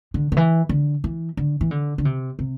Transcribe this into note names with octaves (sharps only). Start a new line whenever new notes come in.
D3
D3
E3
D3
E3
D3
E3
D3
D3
C3
C3